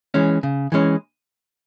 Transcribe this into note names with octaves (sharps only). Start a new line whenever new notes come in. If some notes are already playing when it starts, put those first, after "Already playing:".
E3 G#3 C#4
C#3
E3 G#3 C#4